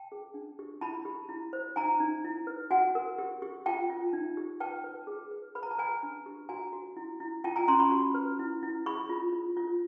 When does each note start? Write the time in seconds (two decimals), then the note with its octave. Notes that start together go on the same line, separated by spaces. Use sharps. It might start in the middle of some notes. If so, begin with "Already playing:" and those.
Already playing: G5 A5
0.12 G#4
0.34 D4
0.59 G4
0.81 E4 A5 B5
1.05 G4
1.29 E4
1.53 C5
1.76 D#4 G#5 A#5
2.00 D#4
2.24 E4
2.47 B4
2.71 F#4 F#5 G#5
2.95 A#4
3.18 G4
3.42 G4
3.66 F4 G5 A5
3.90 F4
4.13 D#4
4.37 G4
4.60 B4 G5 A5
4.84 B4
5.07 G#4
5.31 B4
5.55 B4 B5
5.63 A#5
5.71 A5
5.78 B4 G#5 A#5
6.03 D4
6.26 G4
6.49 F#4 G#5 A#5
6.73 F#4
6.96 E4
7.20 E4
7.44 F4 G5 A5
7.56 G#5 A#5
7.68 C#4 A#5 C6
7.79 B5 C#6
7.92 F#4
8.14 B4
8.39 E4
8.63 E4
8.86 G#4 B5 C#6
9.09 F4
9.33 F4
9.57 F4